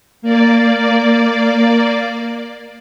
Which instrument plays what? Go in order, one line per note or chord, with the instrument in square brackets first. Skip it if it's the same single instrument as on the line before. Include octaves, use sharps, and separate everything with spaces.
[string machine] A#3 D5